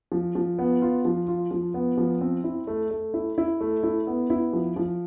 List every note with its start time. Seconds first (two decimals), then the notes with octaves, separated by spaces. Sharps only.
0.12 F3
0.35 F3
0.59 B3
0.82 F4
1.05 F3
1.28 F4
1.51 F3
1.74 B3
1.98 F3
2.21 C4
2.44 E4
2.67 A3
2.91 A3
3.14 E4
3.38 E4
3.61 A3
3.83 E4
4.07 B3
4.30 E4
4.53 F3
4.76 F3